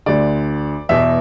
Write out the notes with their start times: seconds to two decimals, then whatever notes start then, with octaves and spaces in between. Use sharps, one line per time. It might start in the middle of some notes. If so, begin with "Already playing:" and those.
0.06 D2 D3 D5
0.89 E2 B2 E5